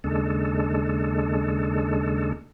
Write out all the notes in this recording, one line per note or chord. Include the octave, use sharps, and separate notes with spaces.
D#2 C#3 G#3 D4 A4